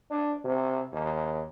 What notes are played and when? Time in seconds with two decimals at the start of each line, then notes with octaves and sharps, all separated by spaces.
0.10 D4
0.45 C3
0.92 D#2